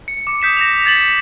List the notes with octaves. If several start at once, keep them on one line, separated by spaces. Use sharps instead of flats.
C#7
D6 C#7
D#6 G6 B6 E7
A#6 E7 F7
G#6 A6 C#7 F#7